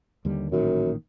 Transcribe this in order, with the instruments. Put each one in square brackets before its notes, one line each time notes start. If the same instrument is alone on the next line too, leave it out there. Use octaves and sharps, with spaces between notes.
[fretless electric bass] D#2 D3 G3
[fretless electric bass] A1 A#2 D#3 [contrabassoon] F#2